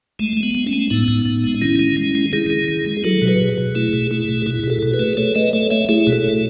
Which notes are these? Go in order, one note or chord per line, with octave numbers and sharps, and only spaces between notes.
G#3 A3
G#3
B3
G#3
A3 C#4
G#3
A2 B3 D#4
A2
A2
G#3
D#3 C#4 E4
D#3
G#3
G#3
D#3 E4 G#4
D#3
D#3
G#3
F#3 F#4 A4
B2
G#4 B4
B2
B2
A3 E4 G#4
B2
A3 E4 G#4
B2
B2 E4 G#4
B2
F#4 A4
B2
G#4 B4
A3
A3 A4 C#5
A3 B4 D#5
A3 A4 C#5
A3 C#5 E5
A3 E4 G#4
B2
F#4 A4
A3